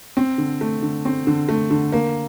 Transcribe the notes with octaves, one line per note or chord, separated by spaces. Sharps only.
C4
D3
A3
D3
C4
D3
A3
D3
A#3